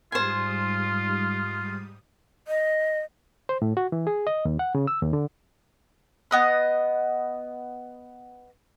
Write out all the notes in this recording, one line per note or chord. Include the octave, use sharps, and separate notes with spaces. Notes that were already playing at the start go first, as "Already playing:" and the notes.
G#2 G3 F4 C5 G#5 D#6
D#5
C5
A2
F#4
E3
G#4
D#5
D#2
F#5
C#3
E6
D#2
D3
B3 D#5 F#6